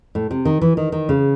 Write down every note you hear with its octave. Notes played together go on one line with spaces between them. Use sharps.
A2
C3
D#3
E3
D#3
D#3
C#3